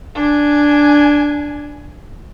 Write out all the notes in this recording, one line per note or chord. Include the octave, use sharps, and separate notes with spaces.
D4 G#5